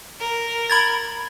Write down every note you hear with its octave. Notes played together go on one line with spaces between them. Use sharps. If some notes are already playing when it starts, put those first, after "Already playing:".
A#4
B5 G#6 A6